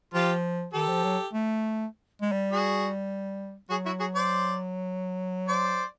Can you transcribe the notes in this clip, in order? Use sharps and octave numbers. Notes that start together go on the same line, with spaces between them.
F3 F4 G4
D#3 G4 A4
F3
F#3
A3
G#3
G3
F#4 G#4
F#3 F#4 G#4
E4 F#4
F#4 G#4
C5 D5
C5 D5